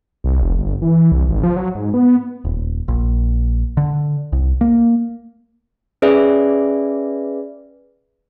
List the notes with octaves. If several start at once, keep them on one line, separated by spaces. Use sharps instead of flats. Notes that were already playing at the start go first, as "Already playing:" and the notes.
C2
F1
G1
E3
C2
G#1
F3
F#3
G#2
B3
D#1
A#1
D3
C2
A#3
C#4 G#4 B4 D5 E5